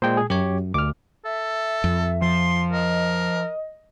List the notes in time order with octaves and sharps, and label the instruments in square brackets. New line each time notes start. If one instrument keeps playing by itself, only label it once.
[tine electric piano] A#2 G#3 [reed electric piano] C5 G5
[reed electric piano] G#4
[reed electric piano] F#2 [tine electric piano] G4 C#5
[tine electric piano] D2 [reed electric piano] D6 F6
[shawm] A4 [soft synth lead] E5
[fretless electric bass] F2
[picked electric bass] F3 [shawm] C6
[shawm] A#4 [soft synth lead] D#5